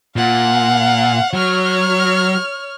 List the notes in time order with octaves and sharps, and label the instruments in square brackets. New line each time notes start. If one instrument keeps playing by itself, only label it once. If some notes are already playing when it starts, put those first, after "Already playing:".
[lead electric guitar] A#2 [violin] F5 F#5
[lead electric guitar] F#3 [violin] C#5 F6